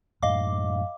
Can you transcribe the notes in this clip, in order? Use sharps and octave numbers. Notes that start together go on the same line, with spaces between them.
F#2 A2 D#5 F5 D6